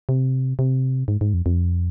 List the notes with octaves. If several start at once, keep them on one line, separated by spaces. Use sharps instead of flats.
C3
C3
G#2
G#2
F2
F2